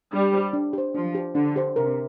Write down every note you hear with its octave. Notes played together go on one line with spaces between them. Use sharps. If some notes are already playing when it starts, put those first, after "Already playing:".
G3 D4
G4 C5
D4
G4 C5
F3 D4
G4 C5
D3 D4
G4 C5
C3 A#4